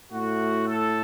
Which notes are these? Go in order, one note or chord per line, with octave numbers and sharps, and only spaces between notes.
A2 A3 F#4
A4